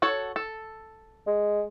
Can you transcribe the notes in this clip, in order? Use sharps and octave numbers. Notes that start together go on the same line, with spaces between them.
F#4 A4 C#5
A4
G#3